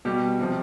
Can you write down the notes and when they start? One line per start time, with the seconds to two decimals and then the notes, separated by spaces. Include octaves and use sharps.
0.05 B2 G3 G4
0.40 C3 F3